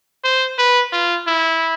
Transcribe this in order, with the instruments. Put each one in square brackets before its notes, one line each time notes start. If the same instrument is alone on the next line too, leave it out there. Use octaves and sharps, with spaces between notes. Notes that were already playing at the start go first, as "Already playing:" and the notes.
[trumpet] C5
B4
F4
E4